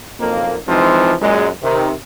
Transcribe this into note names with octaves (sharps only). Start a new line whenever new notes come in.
B1 F2 A#3
E3 F3 G#3 C4 D#4
F#2 A#2 G#3
C3 D#3